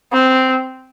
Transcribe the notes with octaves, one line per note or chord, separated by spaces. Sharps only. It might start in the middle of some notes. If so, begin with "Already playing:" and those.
C4